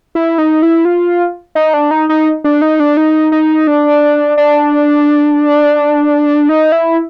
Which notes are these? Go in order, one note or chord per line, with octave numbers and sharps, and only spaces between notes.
E4
D#4
E4
F4
D#4
D4
D#4
D#4
D4
D#4
D4
D#4
D#4
D4
D4
D#4
E4